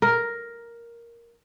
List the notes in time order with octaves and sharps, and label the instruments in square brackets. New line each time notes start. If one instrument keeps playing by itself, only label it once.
[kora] A#4